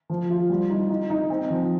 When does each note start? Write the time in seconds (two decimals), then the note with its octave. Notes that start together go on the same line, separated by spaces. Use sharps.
0.10 F3
0.30 F4
0.49 G3
0.70 D#4
0.90 D#4
1.10 D#4
1.30 C4
1.50 F3